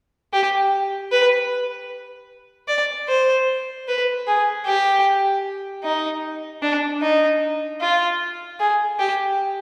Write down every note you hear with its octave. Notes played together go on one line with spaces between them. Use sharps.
G4
B4
D5
C5
B4
G#4
G4
D#4
D4
D#4
F4
G#4
G4